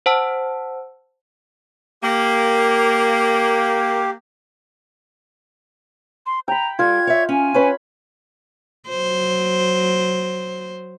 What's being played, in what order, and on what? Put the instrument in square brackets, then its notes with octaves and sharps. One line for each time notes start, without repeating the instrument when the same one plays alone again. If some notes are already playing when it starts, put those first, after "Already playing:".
[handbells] C5 F#5 A5 E6
[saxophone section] A#3 [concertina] G4
[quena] C6
[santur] G5 B5 [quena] A#5
[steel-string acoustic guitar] G3 A4 [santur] F4 [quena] G#6
[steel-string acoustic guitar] C#5 E5
[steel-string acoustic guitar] C#4 [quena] G#5
[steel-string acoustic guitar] C#4 B4 [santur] C#5 B5
[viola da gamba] F#3 C5